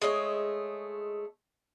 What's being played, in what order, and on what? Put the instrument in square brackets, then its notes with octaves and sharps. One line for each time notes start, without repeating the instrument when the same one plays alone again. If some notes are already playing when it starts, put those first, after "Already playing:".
[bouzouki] G#3 A3 C#5 D#5